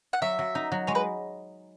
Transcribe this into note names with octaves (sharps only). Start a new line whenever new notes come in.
F#5
F#3 E5
F#3
D#4
F#3
G#3 C#5
B4